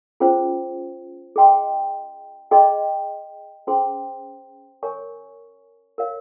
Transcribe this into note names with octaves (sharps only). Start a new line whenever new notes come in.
C#4 F4 G#4 C5
G#4 D#5 G5 C6
G#4 D#5 G5 C6
C#4 G#4 C5 G5 C6
A#4 C#5 G#5 C#6
A#4 C#5 F5